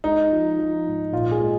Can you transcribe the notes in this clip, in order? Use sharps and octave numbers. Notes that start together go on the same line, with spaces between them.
G#3 D#4
F3
F3
G#2
A#2 F4
G#4
G#3